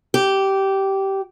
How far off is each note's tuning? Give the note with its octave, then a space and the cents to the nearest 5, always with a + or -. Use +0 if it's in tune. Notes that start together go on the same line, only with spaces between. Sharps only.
G4 -15